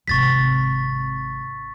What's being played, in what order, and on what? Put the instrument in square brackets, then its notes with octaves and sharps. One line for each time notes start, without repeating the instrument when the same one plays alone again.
[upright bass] G#1 C3 [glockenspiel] C#6 A6 B6